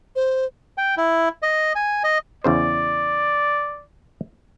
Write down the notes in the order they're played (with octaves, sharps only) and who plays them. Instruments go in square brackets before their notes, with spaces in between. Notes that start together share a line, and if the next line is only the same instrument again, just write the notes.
[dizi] C5
[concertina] G5
E4
D#5
G#5
D#5
[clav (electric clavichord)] E2 C#3 C5 [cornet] D5